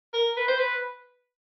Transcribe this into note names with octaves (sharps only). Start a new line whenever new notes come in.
A#4
B4
C5
B4